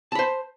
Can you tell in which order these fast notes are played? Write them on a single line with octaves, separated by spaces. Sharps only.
A5 B5 C5